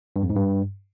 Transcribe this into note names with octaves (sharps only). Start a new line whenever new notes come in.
G2
F2
G#2
G2